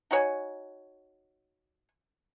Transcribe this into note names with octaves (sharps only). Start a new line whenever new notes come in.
D#4 F#4 C#5 G#5